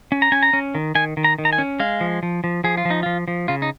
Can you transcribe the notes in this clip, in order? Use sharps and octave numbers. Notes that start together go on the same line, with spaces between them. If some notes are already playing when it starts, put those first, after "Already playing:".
C#4
A#5
C#4 G#5
A#5
C#4
D#3
D#3 G#5
D#3
A#5
D#3
A#5
G#5
C#4
G#3 F5
F3
F3
F3
F3 G#4
F4
F3
D#4
F3 F4
F3
C#3 F4
D#4